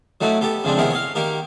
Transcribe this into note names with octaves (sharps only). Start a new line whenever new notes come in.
F#3 A3 D#4 E4 B4
B3 G4 A4
C#3 F3 G#3 C4 D4
C3 D#3 B3 E4 G#4 A#4
C#5 D#5 F5
D#3 A#3 G4 A#4